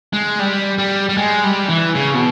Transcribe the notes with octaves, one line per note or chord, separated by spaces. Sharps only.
G#3
G3
G3
G3
G#3
G3
E3
C#3
B2